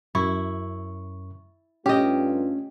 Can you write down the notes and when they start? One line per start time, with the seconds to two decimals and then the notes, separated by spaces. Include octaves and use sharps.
0.15 F#2 E4 C#6
1.86 G2 A3 C#4 F4 G4 D#5